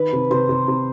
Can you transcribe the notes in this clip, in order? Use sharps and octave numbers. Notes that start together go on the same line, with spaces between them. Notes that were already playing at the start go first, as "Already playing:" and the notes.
Already playing: D#3 B4
C3
C3 C5
C3
C3